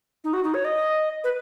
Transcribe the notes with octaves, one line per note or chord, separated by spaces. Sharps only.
D#4
F#4
D#4
C#5
D#5
B4